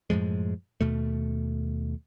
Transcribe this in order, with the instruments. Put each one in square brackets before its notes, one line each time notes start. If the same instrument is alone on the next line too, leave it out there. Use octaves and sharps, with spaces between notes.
[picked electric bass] F#2 A2 F3 G#3
D#2 B2 A3